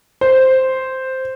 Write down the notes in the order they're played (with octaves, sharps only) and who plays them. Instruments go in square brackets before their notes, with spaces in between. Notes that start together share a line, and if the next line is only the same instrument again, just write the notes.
[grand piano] C5